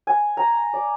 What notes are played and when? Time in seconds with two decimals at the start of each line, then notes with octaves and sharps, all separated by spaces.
0.07 G#5
0.37 A#5
0.73 D5